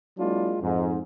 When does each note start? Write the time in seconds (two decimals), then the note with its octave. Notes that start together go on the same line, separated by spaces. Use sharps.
0.18 F#3 G#3 A#3 D4 E4 F4
0.61 F2 G#2